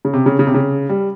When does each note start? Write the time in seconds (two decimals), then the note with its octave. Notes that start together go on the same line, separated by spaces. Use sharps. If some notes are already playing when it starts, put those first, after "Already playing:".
0.05 C#3
0.13 C3
0.26 C#3
0.39 C#3
0.47 C3
0.54 C#3
0.89 G3